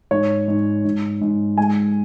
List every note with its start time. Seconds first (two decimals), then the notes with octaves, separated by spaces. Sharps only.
0.11 G#2 C#5
0.48 G#2
0.85 G#2
1.21 G#2
1.57 G#3 G#5